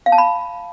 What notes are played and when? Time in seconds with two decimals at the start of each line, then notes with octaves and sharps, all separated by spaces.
0.06 F5
0.12 A5
0.18 B5